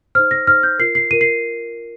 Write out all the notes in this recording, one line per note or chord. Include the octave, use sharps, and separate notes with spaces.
D#4 C5 F6
A#6
D#4 C5 F6
G6
F4 A#4 C7
C7
F4 A#4 D#7
C7